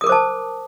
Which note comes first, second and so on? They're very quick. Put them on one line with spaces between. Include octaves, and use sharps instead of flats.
D#6 A#4 D6 C5 A5